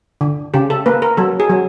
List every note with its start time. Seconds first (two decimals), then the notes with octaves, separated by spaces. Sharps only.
0.21 D3
0.54 C#3 G4
0.70 A4
0.86 A#3 B4
1.02 A#4
1.17 F#3 A4
1.40 G#4
1.50 F#3